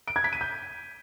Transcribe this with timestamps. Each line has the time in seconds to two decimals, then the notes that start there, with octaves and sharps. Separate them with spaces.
0.08 D7
0.16 G#6
0.24 B6
0.33 D#7
0.41 G6